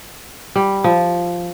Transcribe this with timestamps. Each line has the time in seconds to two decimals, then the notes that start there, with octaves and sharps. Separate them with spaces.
0.56 G3
0.84 F3